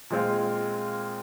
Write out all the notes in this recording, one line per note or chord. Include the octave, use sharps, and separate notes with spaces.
A#2 G#3 C4 F4